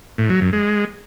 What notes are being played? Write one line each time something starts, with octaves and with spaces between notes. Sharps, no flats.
A2
F#3
F#2
G#3